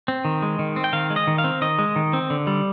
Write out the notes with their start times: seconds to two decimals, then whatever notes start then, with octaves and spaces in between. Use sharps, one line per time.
0.08 C4
0.25 D#3
0.42 G#3
0.59 D#3
0.76 C4
0.84 G5
0.93 D#3 F5
1.10 G#3
1.16 D#5
1.27 D#3
1.38 F5
1.44 C4
1.61 D#3 D#5
1.79 G#3
1.96 D#3
2.13 C4
2.30 D3
2.47 G3